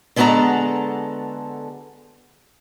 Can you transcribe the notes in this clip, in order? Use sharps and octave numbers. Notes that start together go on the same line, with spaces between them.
D3 G#3 B3 F#4 A4 A#5